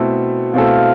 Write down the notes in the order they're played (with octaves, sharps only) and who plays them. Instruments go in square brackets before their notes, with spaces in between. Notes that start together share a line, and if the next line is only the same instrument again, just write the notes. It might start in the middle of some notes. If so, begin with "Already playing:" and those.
Already playing: [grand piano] B2 A3 C4 E4 A4
[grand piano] B2 A3 C4 E4 A4 [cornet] F5